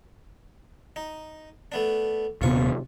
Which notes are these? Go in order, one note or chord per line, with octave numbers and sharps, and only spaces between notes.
D#4
A3 B3 D4
D#1 C3 B3 F4 C#6